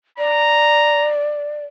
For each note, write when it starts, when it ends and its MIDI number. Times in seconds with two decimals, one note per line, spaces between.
0.18 1.65 74
0.18 1.11 82